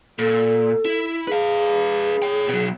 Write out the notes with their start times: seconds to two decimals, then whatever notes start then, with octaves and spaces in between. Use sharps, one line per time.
0.19 A#2 A4
0.85 E4
1.27 G#4 B4 F5
2.22 C#5 G5
2.49 B2 F#3